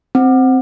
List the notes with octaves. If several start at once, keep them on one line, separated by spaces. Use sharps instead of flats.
C4